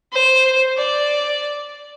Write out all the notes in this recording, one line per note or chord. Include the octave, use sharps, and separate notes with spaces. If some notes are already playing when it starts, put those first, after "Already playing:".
C5
D5